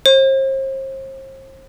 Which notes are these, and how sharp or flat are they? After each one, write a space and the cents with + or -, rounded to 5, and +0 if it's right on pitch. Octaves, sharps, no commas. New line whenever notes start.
C5 +40